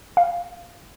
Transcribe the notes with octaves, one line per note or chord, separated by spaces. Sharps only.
F5